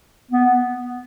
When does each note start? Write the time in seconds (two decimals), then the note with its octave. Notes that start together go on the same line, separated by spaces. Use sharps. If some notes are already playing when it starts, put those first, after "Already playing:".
0.31 B3